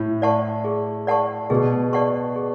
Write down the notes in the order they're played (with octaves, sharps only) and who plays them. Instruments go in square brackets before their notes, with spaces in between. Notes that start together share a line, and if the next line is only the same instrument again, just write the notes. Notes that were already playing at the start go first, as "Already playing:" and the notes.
Already playing: [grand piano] A2
[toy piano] D5 F#5 A5 C#6
G#4
D5 F#5 A5 C#6
[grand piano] B2 [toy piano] G#4
[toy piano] D5 F#5 A5 C#6
G#4